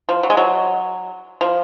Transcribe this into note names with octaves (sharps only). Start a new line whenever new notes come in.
F3
F#3
G#3
F#3
F3